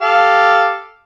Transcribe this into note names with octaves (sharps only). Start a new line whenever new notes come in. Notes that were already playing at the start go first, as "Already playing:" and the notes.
G4 A4 F5